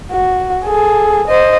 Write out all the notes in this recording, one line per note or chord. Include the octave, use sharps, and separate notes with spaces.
F#4
G#4 A4
C5 D#5